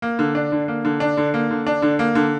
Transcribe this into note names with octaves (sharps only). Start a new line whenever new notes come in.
A#3
D3
D4
D3
A#3
D3
D4
D3
A#3
D3
D4
D3
A#3
D3